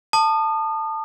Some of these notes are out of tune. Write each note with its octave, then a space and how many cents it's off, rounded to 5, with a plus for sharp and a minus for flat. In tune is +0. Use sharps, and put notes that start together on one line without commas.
A5 +10 D#6 -35